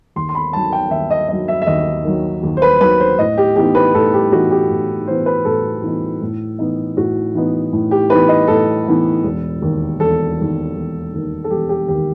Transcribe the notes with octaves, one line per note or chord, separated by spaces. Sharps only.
D#2 C6
C6
B5
D#3 F#3 A5
G5
D#2 E5
D#5
D#3 F#3 D#5
E5
E5
D#2 D#5
D#3 F#3
D#2
C5
B4
D#3 F#3 B4
C5
A2 D#5
G4
E3 B3 D#4 G4
B4
A2 A4
G4
E3 B3 D#4 F#4
G4
A2
E3 B3 D#4 C5
B4
A2 A4
E3 B3 D#4
A2
E3 B3 D#4
A2 F#4
E3 B3 D#4
A2
G4
E3 B3 D#4 B4
D#5
A2 A4
E3 B3 D#4
E1
D#2 D#3
E1 A4
D#2 D#3
E1
D#2 D#3
A4
E1 G4
G4
D#2 D#3 G4